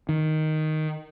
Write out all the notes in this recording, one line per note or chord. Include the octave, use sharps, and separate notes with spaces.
D#3